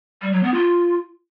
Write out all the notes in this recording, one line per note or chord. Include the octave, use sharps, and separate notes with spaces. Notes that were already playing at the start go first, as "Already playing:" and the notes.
G3
F#3
B3
F4